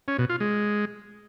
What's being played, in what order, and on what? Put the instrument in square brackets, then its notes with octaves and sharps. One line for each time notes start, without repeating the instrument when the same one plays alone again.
[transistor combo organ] C#4
B2
F4
G#3